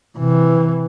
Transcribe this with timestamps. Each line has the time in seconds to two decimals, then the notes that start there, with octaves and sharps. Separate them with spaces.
0.17 C3 E3